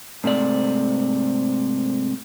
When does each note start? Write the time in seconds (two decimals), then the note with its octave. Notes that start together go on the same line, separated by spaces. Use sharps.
0.24 G#2 C3 A3 D5